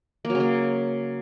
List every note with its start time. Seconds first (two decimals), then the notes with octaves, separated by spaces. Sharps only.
0.25 A#3
0.30 F#3
0.35 C#3
0.40 A#3